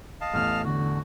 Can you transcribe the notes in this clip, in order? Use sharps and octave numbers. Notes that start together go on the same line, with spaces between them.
D#5 F5 A5
A1 E2 A2 F6
D3 F#4